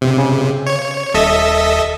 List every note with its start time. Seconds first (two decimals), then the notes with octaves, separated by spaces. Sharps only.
0.01 C3
0.18 C#3
0.67 C#5
1.14 D#1 A4 D#5 E5